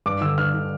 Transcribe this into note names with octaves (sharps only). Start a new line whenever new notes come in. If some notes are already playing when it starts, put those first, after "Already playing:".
G2 D6
D3 E6
G2 F6
D3